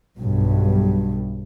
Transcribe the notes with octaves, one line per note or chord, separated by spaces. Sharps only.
B1 G2